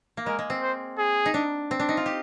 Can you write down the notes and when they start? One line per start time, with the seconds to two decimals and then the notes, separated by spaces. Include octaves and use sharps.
0.17 A#3
0.26 G#3 A#4
0.39 G#3
0.50 C4
0.62 C5
0.98 G#4
1.26 D#4
1.34 D4
1.71 C4
1.79 D4
1.89 D#4
1.97 F4
2.06 G4